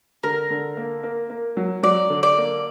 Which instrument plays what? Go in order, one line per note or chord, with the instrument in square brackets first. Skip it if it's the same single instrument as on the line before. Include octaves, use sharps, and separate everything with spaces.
[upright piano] D3 [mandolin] A#4
[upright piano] D3
A#3
A#3
A#3
F#3
[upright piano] F#3 [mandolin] D5
[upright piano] D3
[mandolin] D5
[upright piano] A#3